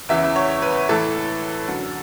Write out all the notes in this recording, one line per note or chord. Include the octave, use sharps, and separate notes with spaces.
E2 C#3 E3 E5
C#5
B4
A2 E3 A4
F#2 D3